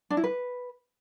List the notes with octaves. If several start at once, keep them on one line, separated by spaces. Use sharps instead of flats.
D4
E4
B4